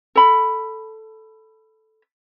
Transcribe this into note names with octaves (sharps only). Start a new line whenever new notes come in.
A4 B5